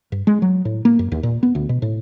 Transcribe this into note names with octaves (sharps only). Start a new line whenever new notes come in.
G2
G#3
F#3
A2
A#3
F#2
D#2
A#2
B3
D2
B2
A2